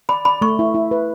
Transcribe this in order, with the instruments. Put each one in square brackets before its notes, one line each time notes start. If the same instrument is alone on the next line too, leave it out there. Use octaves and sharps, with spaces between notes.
[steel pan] D5 [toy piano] B5
[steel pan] D5 [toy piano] B5
[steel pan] A3 [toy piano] C#6
[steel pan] E4
E4
B4